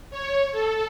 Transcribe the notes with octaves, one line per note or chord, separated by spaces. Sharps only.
C#5
A4